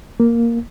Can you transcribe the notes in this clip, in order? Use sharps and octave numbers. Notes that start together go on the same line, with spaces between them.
A#3